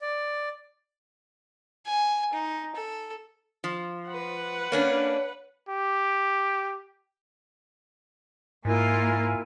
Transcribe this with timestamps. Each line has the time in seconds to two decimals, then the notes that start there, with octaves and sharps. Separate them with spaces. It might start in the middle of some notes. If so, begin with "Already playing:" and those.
0.01 D5
1.86 G#5
2.34 D#4
2.75 A4
3.64 F3
4.08 B4 F#5
4.72 A#3 C#4 D4 C#5
5.69 G4
8.65 G#2 A#3 E4 F4 A#4 G#5